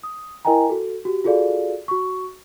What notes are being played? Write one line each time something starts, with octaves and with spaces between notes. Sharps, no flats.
D#6
E4 A#4 D#5 G5 G#5 A#5
F#4 A4
F#4 G4
F4 F#4 G#4 A4 D5 F5
F#4 C#6